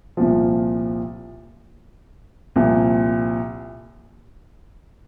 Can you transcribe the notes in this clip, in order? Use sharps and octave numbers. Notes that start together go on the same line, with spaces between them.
C2 A#2 F3
C2 A#2 F3